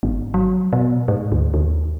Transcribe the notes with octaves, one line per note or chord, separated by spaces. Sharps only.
G#1
F#3
B2
G#2
D2
D#2